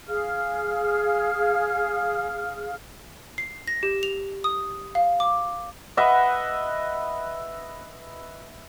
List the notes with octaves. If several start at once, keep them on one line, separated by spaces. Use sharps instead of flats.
G#4 F5 F6
C7
A#6
G4
F7
D#6
F5
D6
B4 D#5 E5 F#5